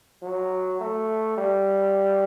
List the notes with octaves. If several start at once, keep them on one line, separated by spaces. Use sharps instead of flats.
F#3
A3
G3